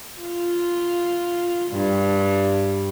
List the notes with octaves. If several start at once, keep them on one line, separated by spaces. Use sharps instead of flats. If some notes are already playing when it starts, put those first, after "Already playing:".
F4
G2